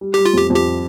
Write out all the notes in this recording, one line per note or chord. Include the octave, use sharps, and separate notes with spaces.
G3
G3 G4
F4
F2 G4
F2
G4